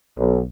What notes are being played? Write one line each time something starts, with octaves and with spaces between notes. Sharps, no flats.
B1